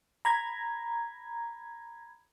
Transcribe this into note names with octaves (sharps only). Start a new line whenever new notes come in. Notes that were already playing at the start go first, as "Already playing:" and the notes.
A#5 B5 G#6